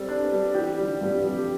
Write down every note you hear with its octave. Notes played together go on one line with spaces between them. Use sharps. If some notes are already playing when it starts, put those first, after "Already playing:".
Already playing: G3 C4 A4
D4
B3
G3
E3 G4
D3 G3
G2 G3
F2 G3